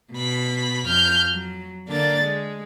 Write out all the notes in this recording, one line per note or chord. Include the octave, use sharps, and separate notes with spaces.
B2 B5
F2 F6 G6
F#3
D3 A#3 D4 A6
G#3